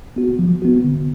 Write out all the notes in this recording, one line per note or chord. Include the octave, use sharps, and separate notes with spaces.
B3 F#4
F3
B3 F#4
D3